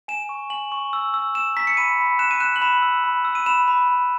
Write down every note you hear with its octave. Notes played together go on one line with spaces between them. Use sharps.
G#5 E7
C#6
G#5 F#7
C#6
E6
E6
E6 E7
A#5 B6
C#7
B5 D#7
B5
F#6 E7
D#7
F#6 E7
F#7
B5 E7
E6
B5
E6
D#7
B5 E7
B5
B5